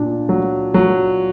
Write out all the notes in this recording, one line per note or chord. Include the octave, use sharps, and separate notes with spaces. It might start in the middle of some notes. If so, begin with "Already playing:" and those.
Already playing: A#2 D4
F#3
F#3